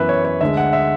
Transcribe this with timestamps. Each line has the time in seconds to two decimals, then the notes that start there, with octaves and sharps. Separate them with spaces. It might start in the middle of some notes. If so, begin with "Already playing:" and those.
Already playing: F#2 E3 B3 B4 E5
0.09 C#5
0.25 C#5
0.41 D2 D3 G#3 E5
0.57 F#5
0.73 E5